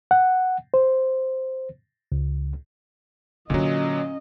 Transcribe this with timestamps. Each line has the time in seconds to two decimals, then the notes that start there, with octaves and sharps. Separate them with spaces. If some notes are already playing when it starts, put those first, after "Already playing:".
0.11 F#5
0.74 C5
2.12 C#2
3.50 A#2 D3 F#3 C#4 D4 D#5